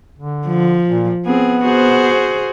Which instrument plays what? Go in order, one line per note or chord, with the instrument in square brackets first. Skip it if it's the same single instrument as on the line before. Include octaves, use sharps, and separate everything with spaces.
[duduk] D3
[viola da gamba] F3
[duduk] A#2
[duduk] B3 [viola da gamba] C4 G#4
[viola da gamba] F#4 G#4 C5